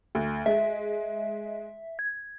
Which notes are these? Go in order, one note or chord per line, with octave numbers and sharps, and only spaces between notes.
D2
G#3 E5
G#6